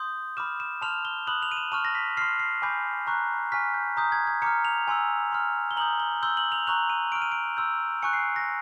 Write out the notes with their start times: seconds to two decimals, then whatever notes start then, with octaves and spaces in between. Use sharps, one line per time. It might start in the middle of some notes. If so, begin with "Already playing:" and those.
Already playing: C6 D#6 G6
0.37 B5 D6 F6 E7
0.60 E7
0.82 A5 C6 F6 F7
1.05 G7
1.27 B5 D#6 F#6 F#7
1.42 F7
1.51 D#7
1.57 E7
1.72 A5 C#6 F6 D#7
1.85 A#6
1.95 B6
2.17 C6 F6 C7
2.39 C7
2.62 G#5 B5 D6 G6
3.07 A#5 C#6 F#6
3.52 G#5 C#6 F6 B6
3.74 G6
3.97 A#5 D#6 G6
4.12 G#6
4.27 G#6
4.42 A#5 D6 F6 C#7
4.65 F7
4.88 G#5 C6 E6
5.32 C6 F6
5.71 G7
5.77 A#5 D#6 G6 F#7
6.00 G7
6.23 C6 E6 G6 G7
6.37 F#7
6.52 F7
6.67 A#5 C#6 F#6 F7
6.90 D#7
7.12 C#6 F6 D7
7.22 D#7
7.32 D7
7.57 C6 E6 G6
8.03 G#5 C#6 F#6 C#7
8.13 C7
8.36 A#6